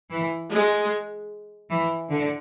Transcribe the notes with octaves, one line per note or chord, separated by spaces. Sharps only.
E3
G#3
E3
D3